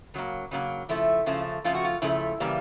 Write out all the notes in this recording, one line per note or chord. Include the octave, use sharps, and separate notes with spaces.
C#3 F#3 A#3
C#3 F#3 A#3
C#3 F3 A3 E4
C#3 F3 A3
C#3 F3 A3 F4
F#4
F4
C#3 F3 A3 E4
C#3 E3 G3 A#3